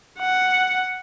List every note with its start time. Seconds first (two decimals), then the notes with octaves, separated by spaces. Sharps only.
0.19 F#5